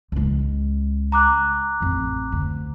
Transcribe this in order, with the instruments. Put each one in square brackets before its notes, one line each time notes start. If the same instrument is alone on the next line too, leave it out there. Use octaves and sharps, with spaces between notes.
[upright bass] C#2 G#3
[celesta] A#5 D6 F#6
[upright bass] A1 F2
D2